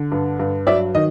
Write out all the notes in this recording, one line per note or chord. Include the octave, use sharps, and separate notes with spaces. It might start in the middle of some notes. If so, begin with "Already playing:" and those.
Already playing: D3
G2
G2
F#3 D5 E5
D#3 D#5